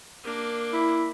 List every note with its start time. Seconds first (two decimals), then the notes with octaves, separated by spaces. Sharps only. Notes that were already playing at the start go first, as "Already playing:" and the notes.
0.24 A#3 D4
0.73 E4